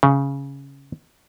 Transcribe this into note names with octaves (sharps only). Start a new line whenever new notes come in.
C#3